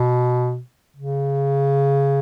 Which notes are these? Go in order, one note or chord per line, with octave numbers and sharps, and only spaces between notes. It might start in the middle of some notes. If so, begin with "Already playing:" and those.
Already playing: B2
C#3